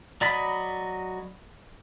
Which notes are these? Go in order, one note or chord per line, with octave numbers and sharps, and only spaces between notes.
F#3 D5 D#5 B5